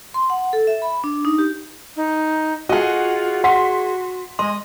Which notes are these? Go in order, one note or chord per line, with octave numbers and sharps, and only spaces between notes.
C6
F#5
A4
E5
B5
D4
D#4
G4
D#4
F4 F#4 G#4 D#5 F#5
F#4 F#5 C6 B6
G#3 D#5 C6